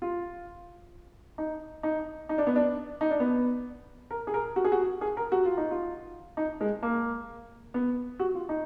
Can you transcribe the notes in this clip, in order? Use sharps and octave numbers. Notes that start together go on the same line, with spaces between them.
F4
D#4
D#4
D#4
D4
B3
D4
D#4
D4
B3
A#4
G#4
A#4
F#4
G#4
F#4
G#4
A#4
F#4
F4
D#4
F4
D#4
G#3
A#3
B3
F#4
F4
D#4